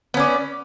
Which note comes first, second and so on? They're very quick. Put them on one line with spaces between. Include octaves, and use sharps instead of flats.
B3 C#4 D5